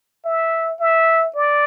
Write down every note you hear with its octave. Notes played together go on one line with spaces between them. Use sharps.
E5
E5
D5